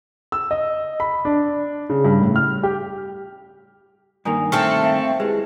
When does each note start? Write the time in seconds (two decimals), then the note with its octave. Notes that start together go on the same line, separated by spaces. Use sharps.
0.32 E6
0.51 D#5
1.00 B5
1.25 D4
1.90 C#3
2.05 G2
2.21 A2
2.36 F6
2.63 G4
4.25 G2 D#3 A#3 G#5 A#5 D#6
4.52 A3 C4 A4 F6
4.82 E5 F5 G5
5.20 G#3 E4 G4 B4